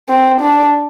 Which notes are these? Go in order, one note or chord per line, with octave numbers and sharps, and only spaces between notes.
C4
D4